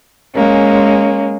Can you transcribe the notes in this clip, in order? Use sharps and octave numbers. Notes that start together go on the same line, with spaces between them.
G#3 A#3 C#4